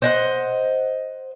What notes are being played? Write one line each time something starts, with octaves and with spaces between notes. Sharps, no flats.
C5 D#5 F#5